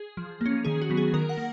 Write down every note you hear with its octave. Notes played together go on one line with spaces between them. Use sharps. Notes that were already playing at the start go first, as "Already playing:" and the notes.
Already playing: G#4
F3
A#3 C#4
D#3 G#4
F#4
F#3 B3
G#4
D#3 A#4
F#5
A#3